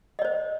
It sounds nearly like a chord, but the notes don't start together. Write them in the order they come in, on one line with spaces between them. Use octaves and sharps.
D#5 D5 C5